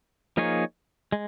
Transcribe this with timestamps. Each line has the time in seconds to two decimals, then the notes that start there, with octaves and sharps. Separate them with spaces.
0.37 F3 A#3 D#4 G#4 C#5
1.12 G#3